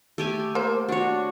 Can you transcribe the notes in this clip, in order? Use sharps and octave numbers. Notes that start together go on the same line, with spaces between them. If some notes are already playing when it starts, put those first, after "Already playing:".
A3 G4 G#5
A#3 C5
D4 F#4 C#5